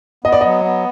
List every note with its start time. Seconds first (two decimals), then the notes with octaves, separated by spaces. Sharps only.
0.24 B3 D#5
0.32 D5
0.41 F#3 D#5
0.65 B3